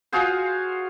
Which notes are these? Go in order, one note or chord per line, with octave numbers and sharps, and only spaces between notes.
F4 F#4 G#4 C5